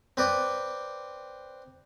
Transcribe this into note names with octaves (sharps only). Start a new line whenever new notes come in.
C4 B4 D5